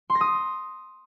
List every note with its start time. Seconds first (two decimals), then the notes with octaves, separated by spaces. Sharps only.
0.10 C6
0.15 A#6
0.21 D#6